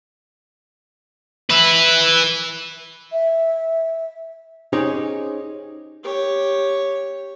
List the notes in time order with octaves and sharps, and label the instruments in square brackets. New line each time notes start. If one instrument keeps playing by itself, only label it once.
[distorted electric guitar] B4 E5
[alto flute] E5
[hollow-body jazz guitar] C#4 D#4 G4 G#4 C5 C#5
[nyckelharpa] G4 C#5